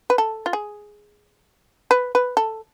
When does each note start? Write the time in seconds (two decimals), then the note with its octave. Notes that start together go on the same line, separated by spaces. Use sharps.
0.10 B4
0.18 A4
0.46 F4
0.53 G#4
1.91 B4
2.15 B4
2.37 A4